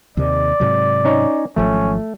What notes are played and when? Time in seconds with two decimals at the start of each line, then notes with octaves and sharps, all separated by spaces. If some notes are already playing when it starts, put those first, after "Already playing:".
0.17 D#2 C3 D#3 D5
0.60 G#2 C3 F#3
1.05 C#4 D#4 C#5
1.56 G#1 F3 F#3 A3 C#4